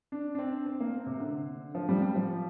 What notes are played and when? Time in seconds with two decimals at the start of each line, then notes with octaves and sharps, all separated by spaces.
0.12 D4
0.35 D4
0.39 C4
0.66 C4
0.80 A#3
1.06 C3
1.20 D3
1.75 F3
1.89 G3
2.02 G3
2.15 F3